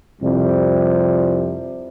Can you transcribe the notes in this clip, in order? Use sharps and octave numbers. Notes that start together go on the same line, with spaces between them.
C2 F2 C3 F3 G3